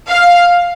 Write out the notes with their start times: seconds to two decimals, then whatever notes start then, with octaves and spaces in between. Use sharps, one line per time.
0.08 F5